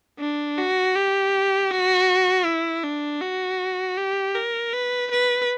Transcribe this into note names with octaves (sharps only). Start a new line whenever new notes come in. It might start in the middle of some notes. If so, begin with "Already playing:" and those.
D4
F#4
G4
F#4
E4
D4
F#4
G4
A#4
B4
B4